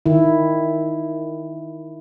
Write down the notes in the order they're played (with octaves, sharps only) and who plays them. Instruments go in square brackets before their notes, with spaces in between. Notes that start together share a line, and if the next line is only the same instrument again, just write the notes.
[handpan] D#3 E4